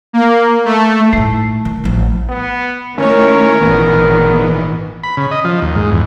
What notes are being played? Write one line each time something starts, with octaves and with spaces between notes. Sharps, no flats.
A#3
A3
A2 A3 D#4
D#3
A1 F3
B3
D#3 A3 C#4 E4 A#4 C#5
G#1 A#2 D#3 E3 B3
B5
C#3
D#5
F3
D#2
G#2
E2